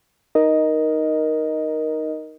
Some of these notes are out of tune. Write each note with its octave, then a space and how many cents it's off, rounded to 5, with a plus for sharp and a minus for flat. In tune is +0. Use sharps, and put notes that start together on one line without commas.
D#4 +0 A#4 +10 D#5 +0